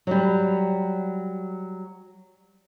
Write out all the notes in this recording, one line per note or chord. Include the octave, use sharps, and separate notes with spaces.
F#3 G3